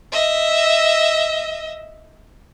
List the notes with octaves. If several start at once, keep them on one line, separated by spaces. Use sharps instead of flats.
D#5 E5